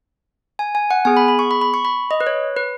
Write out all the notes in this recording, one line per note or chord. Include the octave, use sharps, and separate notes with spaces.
G#5
G#5
F#5
B3 G#4 G#5
B5
B5
C#6
B5
B5
C#6
B5
D#5
B4
C#5
B4